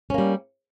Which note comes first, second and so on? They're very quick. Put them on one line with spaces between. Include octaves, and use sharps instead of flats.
C#4 A#3 G3